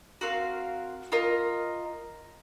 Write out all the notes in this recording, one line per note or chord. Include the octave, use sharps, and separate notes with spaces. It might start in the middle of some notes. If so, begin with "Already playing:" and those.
C4 F#4 A#4 F5
F4 A#4 D#5